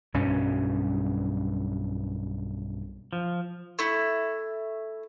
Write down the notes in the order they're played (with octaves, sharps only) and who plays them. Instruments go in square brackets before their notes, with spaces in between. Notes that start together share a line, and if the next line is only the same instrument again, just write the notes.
[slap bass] B1 G2 G3 C#4
[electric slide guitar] F3
[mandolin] A3 E4